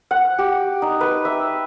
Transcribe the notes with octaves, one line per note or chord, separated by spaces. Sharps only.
F#5
G4
D#4
B4
E5